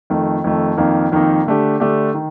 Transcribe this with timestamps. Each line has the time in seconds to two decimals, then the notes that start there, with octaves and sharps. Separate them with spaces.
0.10 F2 D#3 A3
0.44 F2 D#3 A3
0.77 F2 D#3 A#3 D#4
1.12 F2 D#3 A#3 D#4
1.46 D3 A3 D4 G4
1.80 D3 A3 D4 G4
2.14 D#3